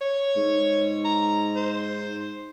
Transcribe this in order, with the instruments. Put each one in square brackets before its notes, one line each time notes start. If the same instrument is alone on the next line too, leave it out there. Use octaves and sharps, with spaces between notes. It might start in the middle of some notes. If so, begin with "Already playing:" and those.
[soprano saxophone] C#5
[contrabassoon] G#2
[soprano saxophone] A#5
C5